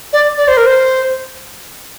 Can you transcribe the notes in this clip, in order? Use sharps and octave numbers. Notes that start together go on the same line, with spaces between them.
D5
D5
C5
A#4
C5